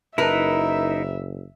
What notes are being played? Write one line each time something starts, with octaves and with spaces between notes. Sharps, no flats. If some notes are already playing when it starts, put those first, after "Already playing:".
F#1 D#4 E4 A#4 B4 E5